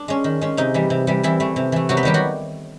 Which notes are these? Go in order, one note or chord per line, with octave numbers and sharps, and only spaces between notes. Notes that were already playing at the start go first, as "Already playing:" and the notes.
Already playing: D4
G#3 C#4
D#3
G#3 C#4
C3 D#4
E3 G3
C3
E3 G3
C3 E3 E4
E3 A3
C3
E3 A3
C3 F#3 F#4
B3 B4
D#3 F#3 G3 G4
F#3 F#4